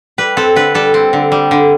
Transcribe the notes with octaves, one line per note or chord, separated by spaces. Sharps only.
G3 B4
C4 A4
D3 B4
G3 A4
C4
D3
G3
D3